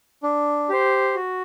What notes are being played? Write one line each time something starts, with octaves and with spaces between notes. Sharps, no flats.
D4
G4 C5
F#4